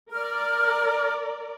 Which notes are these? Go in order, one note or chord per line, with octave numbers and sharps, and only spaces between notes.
A#4 D5 F6